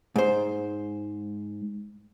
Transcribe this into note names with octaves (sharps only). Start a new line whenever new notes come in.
G#2 C5